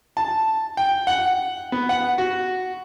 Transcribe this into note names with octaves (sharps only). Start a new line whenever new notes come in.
A5
G5
F#5
B3
F#5
F#4